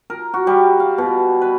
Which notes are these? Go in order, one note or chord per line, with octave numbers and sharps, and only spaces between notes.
A#4
F#4
G3
F5
B2
B4